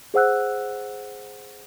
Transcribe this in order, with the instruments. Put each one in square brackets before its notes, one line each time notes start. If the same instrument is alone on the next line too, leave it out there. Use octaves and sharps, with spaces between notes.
[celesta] G#4 C5 F#5 E6 F#6